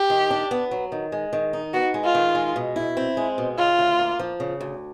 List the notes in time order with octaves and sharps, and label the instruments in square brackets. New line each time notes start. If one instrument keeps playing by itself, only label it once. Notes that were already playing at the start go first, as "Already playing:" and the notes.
Already playing: [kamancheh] G4
[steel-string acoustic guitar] D#3
D4
B3
F#3
D#3
G#3
D#3
D#4
[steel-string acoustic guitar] B3 [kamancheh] F#4
[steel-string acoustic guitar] G#3
[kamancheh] F4
[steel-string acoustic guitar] D#3
G#3
B2
E4
C4
G#3
B2
[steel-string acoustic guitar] C#3 [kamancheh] F4
[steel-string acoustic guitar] D2
A#3
F3
C#3
D2